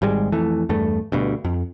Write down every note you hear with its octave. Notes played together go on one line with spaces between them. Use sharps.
G#1 G#2 G3 G#3
F2 E3 A3
E2 G2 A3
D2 G2 B2
F2